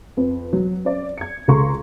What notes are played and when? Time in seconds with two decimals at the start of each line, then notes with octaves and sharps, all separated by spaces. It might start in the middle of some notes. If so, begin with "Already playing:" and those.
0.17 F2 B4
0.53 F#3
0.85 C#4 D5
1.18 G#6 C#7
1.48 C#2 C#3 A4 A#5 C6 C#6